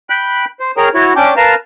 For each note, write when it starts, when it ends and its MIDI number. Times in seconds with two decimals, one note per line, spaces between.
0.10 0.45 79
0.10 0.45 83
0.10 0.45 90
0.60 0.71 72
0.77 0.89 68
0.77 0.89 70
0.77 0.89 73
0.77 0.89 79
0.77 0.89 82
0.94 1.13 64
0.94 1.13 66
0.94 1.13 73
1.16 1.34 61
1.16 1.34 62
1.16 1.34 79
1.16 1.34 86
1.37 1.55 70
1.37 1.55 71
1.37 1.55 77
1.37 1.55 81
1.37 1.55 82